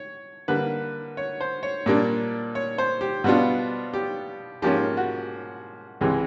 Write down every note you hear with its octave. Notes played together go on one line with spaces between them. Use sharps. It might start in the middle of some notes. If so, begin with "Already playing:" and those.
Already playing: C#5
D3 G3 A#3 B4
C#5
C5
C#5
A#2 G3 A#3 D4
C#5
C5
G4
B2 G3 B3 D4 F4 F#4
G4
G#2 F3 A#3 C#4 G4
F#4
C#2 C3 E3 G#3